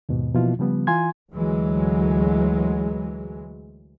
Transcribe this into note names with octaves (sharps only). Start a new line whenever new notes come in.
D#2 G#2 B2
B2 E3 F3 A#3 E4 F4
C#3 F3 G3 B3
E3 F4 G#5 C6 G#6
D2 E3 F#3 G#3